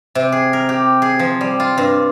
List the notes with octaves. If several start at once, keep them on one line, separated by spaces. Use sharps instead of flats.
C3
G#4
A#4
G4
G#4
F3
G3
F4
G2